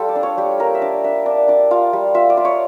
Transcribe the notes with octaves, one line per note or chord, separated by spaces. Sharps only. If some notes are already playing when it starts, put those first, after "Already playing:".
Already playing: G3 F4 G4 A4
D5
D4
C#5
G3 G4
A#3 A#4
E5
D4 D5
D4 E5
D4 D5
D4 D5
F4 F5
G3
F4 E5
D5
F4
C#5